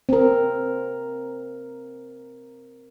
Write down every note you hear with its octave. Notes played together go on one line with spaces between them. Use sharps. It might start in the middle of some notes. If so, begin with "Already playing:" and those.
C4 A#4